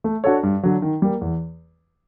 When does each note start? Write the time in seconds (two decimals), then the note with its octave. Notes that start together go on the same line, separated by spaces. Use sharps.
0.04 A3
0.24 D4 F#4 A4 C#5
0.43 G2
0.63 D3 F#3
0.82 D#3
1.02 G3 A#3
1.21 E2